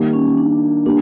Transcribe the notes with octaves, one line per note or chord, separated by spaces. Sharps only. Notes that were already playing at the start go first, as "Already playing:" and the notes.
Already playing: D#3 G3 A#3
C#4
D4
G3 A#3 D4